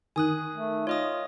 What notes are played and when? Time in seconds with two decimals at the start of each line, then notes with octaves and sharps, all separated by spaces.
0.16 D#3 G#5 D#6 F#6
0.55 A3
0.87 F4 C#5 D#5 D#6